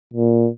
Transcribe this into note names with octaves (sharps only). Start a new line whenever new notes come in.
A#2